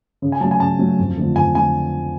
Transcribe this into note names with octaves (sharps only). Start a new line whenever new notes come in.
C#3
G#5
F#3 A3 A5
G#5
C#3 A5
F#3 A3
F2
D3 F3 A3
F2 G#5
D3 F3 A3 G#5